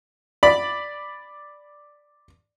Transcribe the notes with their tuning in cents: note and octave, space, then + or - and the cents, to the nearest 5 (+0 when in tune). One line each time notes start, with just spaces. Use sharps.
D5 +0 B5 +0